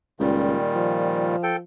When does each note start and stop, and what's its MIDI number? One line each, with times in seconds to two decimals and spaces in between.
0.20 0.57 37
0.20 1.36 46
0.20 1.36 51
0.20 1.36 55
0.75 1.62 53
1.43 1.56 69
1.43 1.56 79